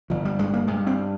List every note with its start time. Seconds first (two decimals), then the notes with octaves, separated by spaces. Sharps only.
0.10 G1 F3
0.25 G3
0.39 G2 G#3
0.54 A#3
0.67 G2 G#3
0.87 C4